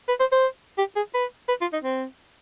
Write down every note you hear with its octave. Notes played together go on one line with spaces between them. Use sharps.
B4
C5
C5
G4
G#4
B4
B4
F4
D#4
C4